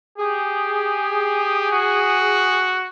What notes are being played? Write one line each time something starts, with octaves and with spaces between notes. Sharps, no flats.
G4 G#4
F#4